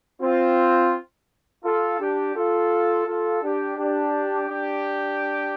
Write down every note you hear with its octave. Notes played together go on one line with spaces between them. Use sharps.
C4 F4
F4 A4
D4 G4
F4 A4
F4 A4
D4 G4
D4 G4
D4 G4